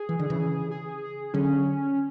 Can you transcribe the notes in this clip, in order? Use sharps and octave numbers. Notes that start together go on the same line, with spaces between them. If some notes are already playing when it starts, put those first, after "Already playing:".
Already playing: G#4
E3
D3
C#3 E3
G#4
D3 F#3 C#4